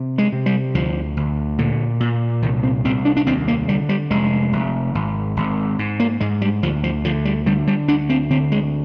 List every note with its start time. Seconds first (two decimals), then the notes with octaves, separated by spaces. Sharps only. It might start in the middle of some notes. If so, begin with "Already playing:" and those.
Already playing: C3
0.18 G#3
0.32 C3
0.46 G3
0.74 D2 F3
1.17 D2
1.58 A#2 D3
2.00 A#2
2.42 C2 D#3
2.63 C4
2.84 C2 C4
3.05 D4
3.17 D4
3.26 D#2 C4
3.48 A#3
3.68 D3 G3
3.89 G3
4.10 F1 G#3
4.52 F1
4.95 G#1
5.37 G#1
5.79 G#2
6.00 A#3
6.20 G#2 G#3
6.41 G3
6.62 D2 F3
6.84 F3
7.05 D3 F3
7.25 G3
7.46 D3 G3
7.67 G3
7.88 D2 D4
8.09 C4
8.30 D3 C4
8.52 G#3